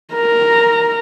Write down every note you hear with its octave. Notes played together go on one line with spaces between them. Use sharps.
A#4 A#5